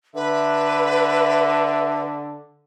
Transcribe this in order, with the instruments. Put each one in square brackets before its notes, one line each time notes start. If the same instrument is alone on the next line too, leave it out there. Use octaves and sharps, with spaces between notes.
[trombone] D3 [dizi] B4 [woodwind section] E5